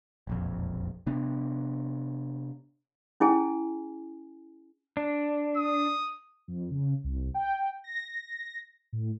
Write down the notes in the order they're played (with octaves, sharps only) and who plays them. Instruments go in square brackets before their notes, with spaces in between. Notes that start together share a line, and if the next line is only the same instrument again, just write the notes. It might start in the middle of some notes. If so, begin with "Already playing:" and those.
[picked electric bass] E1 A#1 F2
C3 B3 D4
[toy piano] C#4 E4 G#4 G#5
[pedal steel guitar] D4
[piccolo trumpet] D#6
[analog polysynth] F2
C#3
C2
G5
A#6
A2